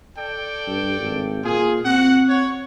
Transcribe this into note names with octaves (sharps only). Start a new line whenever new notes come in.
A4 D5 G5
G2
G#1
A#2 F4 G#4
C4 F#4 F#5
C#5